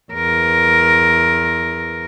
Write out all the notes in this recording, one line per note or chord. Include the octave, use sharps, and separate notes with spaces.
E2 A#4